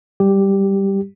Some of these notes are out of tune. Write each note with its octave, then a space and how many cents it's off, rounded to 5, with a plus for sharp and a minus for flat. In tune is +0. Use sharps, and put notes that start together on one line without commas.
G3 +0 G4 +0